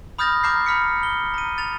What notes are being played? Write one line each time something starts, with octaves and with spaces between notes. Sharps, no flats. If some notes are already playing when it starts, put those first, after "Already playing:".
B5 D#6 F6 G6 A6 A#6
A#5 D6 F6 G6 C7
B5 F6 B6 C#7
G7
A#5 D#7
A6 F7